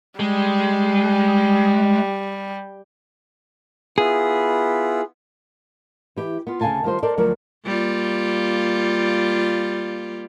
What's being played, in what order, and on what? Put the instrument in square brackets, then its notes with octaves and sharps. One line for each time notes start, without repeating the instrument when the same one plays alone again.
[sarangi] G3 [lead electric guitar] G#3
[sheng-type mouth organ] B3 E4 F4 [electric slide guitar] G#4
[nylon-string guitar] E3 G4 E5
B3 F4
D2 C#3 A4 F5 G#5 A5
D#3 G3 F4 C5
A4 A#4 C5 D5
D2 F3 F#3 A#4 C#5 D5
[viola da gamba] G3 A#3 F4